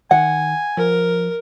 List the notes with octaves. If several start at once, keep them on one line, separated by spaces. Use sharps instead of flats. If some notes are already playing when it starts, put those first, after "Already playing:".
D#3 F#5 G#5
F3 A#4